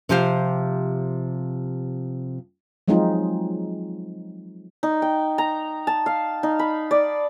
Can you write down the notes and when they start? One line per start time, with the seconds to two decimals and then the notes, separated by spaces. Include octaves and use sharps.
0.09 C3 F3 G4 C5 F5
2.88 F3 F#3 G#3 C4 D#4 F4
4.83 D#4
5.02 G5
5.38 A#5
5.87 A5
6.06 F5
6.43 D#4
6.59 B5
6.91 D5